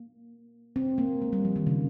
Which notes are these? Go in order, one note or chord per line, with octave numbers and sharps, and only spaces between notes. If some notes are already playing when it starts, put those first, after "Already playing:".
Already playing: A#3
C4
A#3
G#3
G3
F3
D#3
C#3